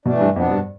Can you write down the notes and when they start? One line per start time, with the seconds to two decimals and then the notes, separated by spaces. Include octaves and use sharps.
0.05 B2 E3 A3 D4
0.21 G2
0.36 F2 B2 B3 D4
0.51 G2